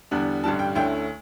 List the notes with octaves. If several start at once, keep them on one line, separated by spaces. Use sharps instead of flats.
E2 D3 G3 B3 D4
A1 G2 D3 G3 A5
G5
D2 D3 A3 C#4 E4 G5